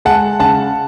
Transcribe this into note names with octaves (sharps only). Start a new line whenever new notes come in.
G#3 F#5 A5
C#3 F#5 A5